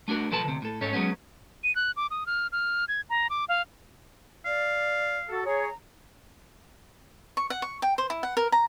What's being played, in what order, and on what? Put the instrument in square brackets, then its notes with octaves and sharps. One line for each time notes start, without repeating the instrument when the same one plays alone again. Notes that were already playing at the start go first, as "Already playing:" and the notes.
[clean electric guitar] A3 D4 F#4 A#4
B1 F3 A4 B4 A5
D2 C3
A2 A4
G#2 C#4 A4 C#5
F#3 G#3 B3 C#4
[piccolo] D#7
F#6
D6
D#6
F6
F6
G#6
A#5
D6
F5
[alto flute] D5 [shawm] F5
[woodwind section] F#4 A4
[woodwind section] G#4 C#5 [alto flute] A#5
[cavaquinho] C#6
F#5
C#6
G5
C5
E4
F#5
A#4
A#5